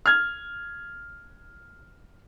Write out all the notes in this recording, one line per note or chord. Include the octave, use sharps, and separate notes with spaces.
F6 G#6